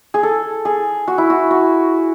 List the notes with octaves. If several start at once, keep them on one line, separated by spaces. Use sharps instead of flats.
G#4
A4
G#4
F#4
E4
F#4
F#4